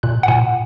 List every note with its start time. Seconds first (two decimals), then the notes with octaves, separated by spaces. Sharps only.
0.03 A#2 F#6
0.23 F#5
0.28 A#2 G#5